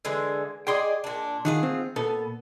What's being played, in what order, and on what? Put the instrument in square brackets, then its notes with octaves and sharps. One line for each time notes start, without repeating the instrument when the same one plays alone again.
[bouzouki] D3 E3 G#3
[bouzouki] G#4 D5 D#5 [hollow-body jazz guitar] G5 C6
[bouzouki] A#2 D4
[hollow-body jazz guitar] D#3 [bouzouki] F4 G#4 F#5
[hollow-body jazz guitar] C4
[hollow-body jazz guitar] A#2 A4 [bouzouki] B3